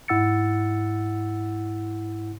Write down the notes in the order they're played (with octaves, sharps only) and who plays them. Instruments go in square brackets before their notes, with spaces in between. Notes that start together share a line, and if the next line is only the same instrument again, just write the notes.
[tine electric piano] G#2 E4 F#5 E6 A6 C#7